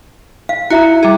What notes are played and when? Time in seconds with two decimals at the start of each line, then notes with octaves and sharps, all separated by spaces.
0.49 F5
0.70 E4 F#4 E5 A#5
1.03 G3 G#4